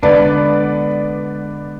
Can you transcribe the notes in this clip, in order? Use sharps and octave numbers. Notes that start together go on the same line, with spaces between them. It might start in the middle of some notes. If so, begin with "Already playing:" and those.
D3 G#3 B3 D4 B4 D5